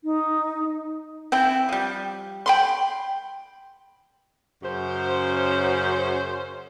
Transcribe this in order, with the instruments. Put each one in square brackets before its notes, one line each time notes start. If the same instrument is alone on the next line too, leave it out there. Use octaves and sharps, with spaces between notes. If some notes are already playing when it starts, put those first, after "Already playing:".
[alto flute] D#4
[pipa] C4 E4 G5
F3 G3
G5 B5 C6
[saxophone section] F#2 C#3 C#4 C5